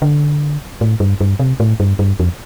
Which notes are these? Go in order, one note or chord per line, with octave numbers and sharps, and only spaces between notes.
D3
A2
G2
G2
C3
A2
G2
G2
F2